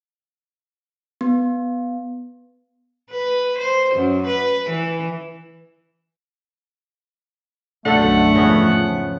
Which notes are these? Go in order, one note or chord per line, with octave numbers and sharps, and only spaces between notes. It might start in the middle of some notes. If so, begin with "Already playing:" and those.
B3
B4
C5
F#2
B4
E3
F#1 B1 F#2 D3 A3 A4 F#5
E2 G#2 C#3 F3 B3 C#4